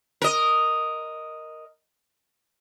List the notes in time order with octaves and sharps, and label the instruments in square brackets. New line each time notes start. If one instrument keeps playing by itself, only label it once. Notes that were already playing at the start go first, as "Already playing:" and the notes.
[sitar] A#4 D#5